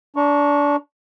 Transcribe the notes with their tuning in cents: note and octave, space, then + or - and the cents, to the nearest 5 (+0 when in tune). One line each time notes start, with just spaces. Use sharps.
D4 -20 A#5 +0 C#6 +0